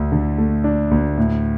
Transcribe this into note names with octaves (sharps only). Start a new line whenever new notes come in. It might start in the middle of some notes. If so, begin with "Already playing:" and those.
Already playing: D2 D4
D3
A3
D4
D2
A2